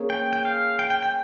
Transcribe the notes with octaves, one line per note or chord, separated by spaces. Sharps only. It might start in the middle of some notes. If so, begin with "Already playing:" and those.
Already playing: A#3 C#4 G#4 C5
G5
G5
F5
G5
G5
G5